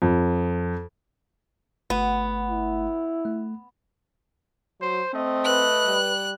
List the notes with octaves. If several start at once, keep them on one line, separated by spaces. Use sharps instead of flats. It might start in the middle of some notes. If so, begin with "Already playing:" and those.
F2
G1 A3 B3 F#5
E4
A3
F#3 C5
A3 C4 D#5
B4 F#6
G3